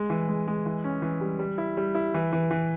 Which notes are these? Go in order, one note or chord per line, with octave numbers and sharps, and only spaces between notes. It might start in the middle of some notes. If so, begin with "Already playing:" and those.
Already playing: G#3
E3
G#3
G#3
E3
C#4
E3
G3
G3
E4
G3
E4
E3
E3
E3